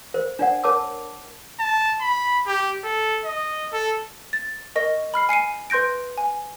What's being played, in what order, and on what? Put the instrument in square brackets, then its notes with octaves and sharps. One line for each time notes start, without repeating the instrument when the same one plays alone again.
[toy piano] A#4 C5
D4 D5 F#5
A#4 C#5 A5 D6 E6
[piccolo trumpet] A5
B5
G4
A4
D#5
A4
[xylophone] A6
A#4 D#5 C#6 A#6
B5 F6 C7
G#5 C7 C#7 D#7
B4 C6 G6 A#6 D7
G#5